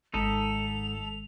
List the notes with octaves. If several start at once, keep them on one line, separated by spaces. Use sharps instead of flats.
G#1 G#2 G#3 D#4 A4 B6 F7